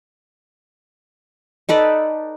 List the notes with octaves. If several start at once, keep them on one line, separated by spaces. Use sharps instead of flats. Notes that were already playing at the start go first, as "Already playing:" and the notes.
D#4 A4 B4 D5